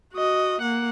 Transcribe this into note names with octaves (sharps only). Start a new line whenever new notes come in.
F#4 D#5
A#3 F#5